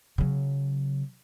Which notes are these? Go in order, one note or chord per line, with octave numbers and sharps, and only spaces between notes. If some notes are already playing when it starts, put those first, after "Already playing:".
C#3 F#3